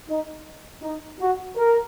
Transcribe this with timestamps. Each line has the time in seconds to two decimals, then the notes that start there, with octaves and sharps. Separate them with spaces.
0.09 D#4
0.83 D#4
1.20 F#4
1.56 A#4